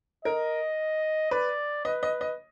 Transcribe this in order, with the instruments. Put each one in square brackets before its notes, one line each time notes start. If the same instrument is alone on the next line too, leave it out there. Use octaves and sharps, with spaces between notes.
[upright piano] A#4 [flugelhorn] D#5
[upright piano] B4 [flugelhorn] D5
[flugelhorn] B4 [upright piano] D#5
[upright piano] D#5
D#5